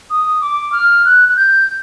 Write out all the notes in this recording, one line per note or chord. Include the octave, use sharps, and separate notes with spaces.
D#6
D6
F6
F#6
F#6
G6